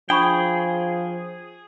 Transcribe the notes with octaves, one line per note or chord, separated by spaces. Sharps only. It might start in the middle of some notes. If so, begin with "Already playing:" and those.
F3 D4 G#4 G5 B5 C#6